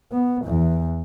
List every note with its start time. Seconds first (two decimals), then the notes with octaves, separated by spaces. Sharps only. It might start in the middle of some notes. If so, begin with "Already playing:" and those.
0.12 B3
0.45 E2 E3